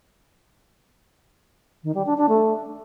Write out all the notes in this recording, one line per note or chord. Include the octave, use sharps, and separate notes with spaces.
D#3
G3
D4
D4
A3